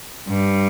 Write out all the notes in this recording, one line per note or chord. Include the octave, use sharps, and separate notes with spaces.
G2